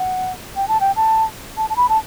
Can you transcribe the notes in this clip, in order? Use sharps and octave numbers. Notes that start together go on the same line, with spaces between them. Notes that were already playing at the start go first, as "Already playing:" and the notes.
Already playing: F#5
G5
A5
G5
A5
A5
A5
B5
A5